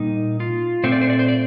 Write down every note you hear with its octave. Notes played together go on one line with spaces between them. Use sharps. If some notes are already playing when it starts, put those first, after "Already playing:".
Already playing: A#2 G3 A#3 D#4
F4
A#2 A3 C4 C5
D5
C5
D5
C5
D5